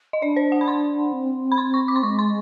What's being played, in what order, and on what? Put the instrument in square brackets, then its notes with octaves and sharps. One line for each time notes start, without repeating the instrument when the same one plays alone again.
[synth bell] D#5
[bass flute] D4 [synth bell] D5
[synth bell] C5
F#5
B5
C6
[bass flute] C4
[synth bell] B5
C6
C#6
D6
C6
[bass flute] G#3 [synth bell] C#6
[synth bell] C6